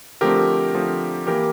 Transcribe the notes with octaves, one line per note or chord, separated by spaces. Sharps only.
D3 F3 A3 C4 G4 A#4
D3 F3 A3 C4
E3 A#3 G4 A#4